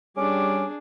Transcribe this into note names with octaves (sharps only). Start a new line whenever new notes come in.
G3 C#4 D4 G#4 D6